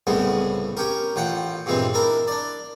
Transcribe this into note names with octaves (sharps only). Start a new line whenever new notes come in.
C2 A2 C#3 G#3 B3
C#4 G4 A#4
A1 F4 F#5 G5
G2 A#2 E3 G#3 C4
D4 E4 A#4
D4 D5